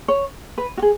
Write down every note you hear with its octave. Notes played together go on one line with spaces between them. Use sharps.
C#5
B4
F#4
G#4